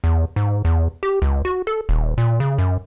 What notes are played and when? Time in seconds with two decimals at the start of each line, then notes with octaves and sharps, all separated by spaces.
0.04 E2
0.36 G#2
0.65 E2
1.03 G4
1.22 C#2
1.45 F#4
1.67 A4
1.89 D#1
2.18 A#2
2.40 C#3
2.58 F#2